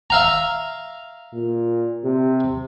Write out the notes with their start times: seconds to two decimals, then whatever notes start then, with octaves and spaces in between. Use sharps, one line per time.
0.10 E5 F5 A#5
1.34 A#2
2.04 C3